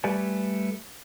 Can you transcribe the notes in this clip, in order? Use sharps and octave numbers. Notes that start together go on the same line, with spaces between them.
G3 A3 G4 B4 D5 G#5